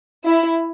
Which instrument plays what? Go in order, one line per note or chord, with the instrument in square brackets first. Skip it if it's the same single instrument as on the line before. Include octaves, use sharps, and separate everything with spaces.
[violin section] E4